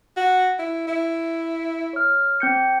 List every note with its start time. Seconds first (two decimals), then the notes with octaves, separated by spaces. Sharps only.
0.17 F#4
0.59 E4
0.87 E4
1.93 C#5 F6
2.40 C4 G6 C#7